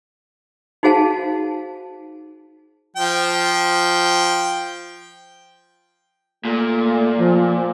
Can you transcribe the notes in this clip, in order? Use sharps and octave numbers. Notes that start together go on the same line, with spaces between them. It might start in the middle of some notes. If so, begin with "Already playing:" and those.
D#4 F#4 G#4 C5 F5 A5
F3 G5
A#2 A3
F3